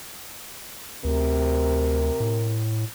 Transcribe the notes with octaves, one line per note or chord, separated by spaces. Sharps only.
D2 C3 A#4
A2